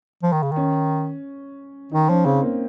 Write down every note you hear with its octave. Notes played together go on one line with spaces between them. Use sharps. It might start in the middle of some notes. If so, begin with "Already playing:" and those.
F3
D#3
C#3
D#3 C#4
D#3 D#4
F3 C#4
C#3 C4
A#3